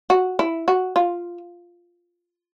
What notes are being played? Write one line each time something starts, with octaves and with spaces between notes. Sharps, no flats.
F#4
E4
F#4
F4